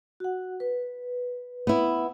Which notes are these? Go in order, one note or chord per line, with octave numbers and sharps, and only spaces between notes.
F#4 F#5
B4
B3 E4